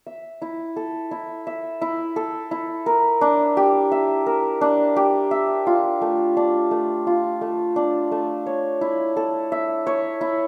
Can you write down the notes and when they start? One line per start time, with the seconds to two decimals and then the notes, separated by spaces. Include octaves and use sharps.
0.07 E5
0.42 E4
0.76 A4
1.11 E4
1.47 E5
1.82 E4
2.16 A4
2.51 E4
2.86 A#4
3.21 D4
3.57 G4
3.92 E5
4.26 A#4
4.61 D4
4.96 G4
5.31 E5
5.67 F4
6.01 A3
6.37 D4
6.71 A3
7.07 F4
7.41 A3
7.76 D4
8.11 A3
8.46 C#5
8.81 E4
9.16 A4
9.52 E5
9.87 C#5
10.21 E4